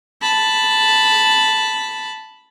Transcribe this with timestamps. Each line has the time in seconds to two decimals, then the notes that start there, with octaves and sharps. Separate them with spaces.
0.22 A5 B5